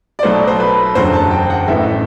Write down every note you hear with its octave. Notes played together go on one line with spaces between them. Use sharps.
D5
B1 B2 F#3 A3 C5
C5
B4
F#1 E2 D3 F#3 C5
A5
G5
F#5
A1 A2 E3 A3 E5